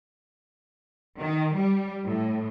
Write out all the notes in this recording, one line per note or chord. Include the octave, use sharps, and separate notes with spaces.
D#3
G3
A2